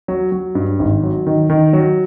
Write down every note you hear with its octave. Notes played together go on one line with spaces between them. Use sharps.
F#3
F#3
G2
G#1
F#3
D#3
D#3
F#3